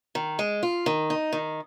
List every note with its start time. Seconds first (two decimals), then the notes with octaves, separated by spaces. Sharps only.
0.15 D#3
0.39 G#3
0.63 F4
0.86 D#3
1.10 D#4
1.33 D#3